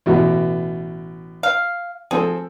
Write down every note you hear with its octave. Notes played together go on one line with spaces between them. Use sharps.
A1 B2
F5
F3 C4 G#4 A4